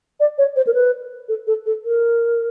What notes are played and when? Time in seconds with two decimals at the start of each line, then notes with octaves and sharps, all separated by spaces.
0.20 D5
0.38 C#5
0.56 C5
0.67 A#4
0.74 B4
1.28 A4
1.47 A4
1.66 A4
1.84 A#4